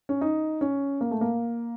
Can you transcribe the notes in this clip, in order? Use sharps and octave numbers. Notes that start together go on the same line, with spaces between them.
C#4
D#4
C#4
A#3
A3
A#3